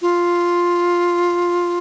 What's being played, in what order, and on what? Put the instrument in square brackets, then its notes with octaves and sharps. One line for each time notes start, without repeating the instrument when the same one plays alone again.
[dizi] F4